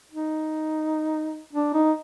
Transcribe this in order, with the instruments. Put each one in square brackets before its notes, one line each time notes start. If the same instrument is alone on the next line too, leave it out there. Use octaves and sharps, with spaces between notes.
[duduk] D#4
D4
D#4